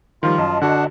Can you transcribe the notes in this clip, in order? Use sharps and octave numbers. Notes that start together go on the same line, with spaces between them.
D#3 F3 G3 F4
F#2 D#5 A5
D3 D4 F#4 F#5